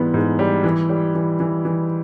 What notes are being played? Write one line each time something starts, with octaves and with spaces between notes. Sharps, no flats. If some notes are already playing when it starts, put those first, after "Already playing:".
Already playing: G#2 E3 G3 B3
G#2
G3
E3
G3
E3
E3
E3